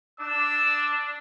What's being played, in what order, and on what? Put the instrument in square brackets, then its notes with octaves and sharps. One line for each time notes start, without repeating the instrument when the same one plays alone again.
[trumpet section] D4 [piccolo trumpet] E6